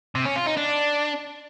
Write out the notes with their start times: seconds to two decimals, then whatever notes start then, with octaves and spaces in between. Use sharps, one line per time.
0.15 C3
0.25 C#4
0.36 F4
0.46 D#4
0.57 D4